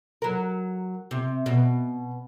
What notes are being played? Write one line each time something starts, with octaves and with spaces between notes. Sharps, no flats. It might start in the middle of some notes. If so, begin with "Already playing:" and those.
F#3 A#4
C3
B2